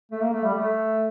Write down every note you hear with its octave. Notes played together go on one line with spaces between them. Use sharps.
A3
A#3
A3
G3
A3